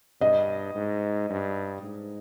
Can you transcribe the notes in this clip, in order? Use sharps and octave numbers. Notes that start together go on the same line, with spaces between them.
G2 D#5
G#2
G2
G#2